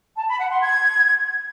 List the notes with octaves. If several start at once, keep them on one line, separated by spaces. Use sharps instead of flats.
A5
B5
F#5
C6
G#6